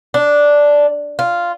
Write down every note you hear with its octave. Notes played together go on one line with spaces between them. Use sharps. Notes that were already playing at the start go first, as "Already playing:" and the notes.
D4
F4